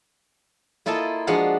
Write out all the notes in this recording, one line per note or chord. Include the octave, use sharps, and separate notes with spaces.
A#3 E4 F4 A4 D#5 A5
F3 G#3 D4 F#4 F5 F#5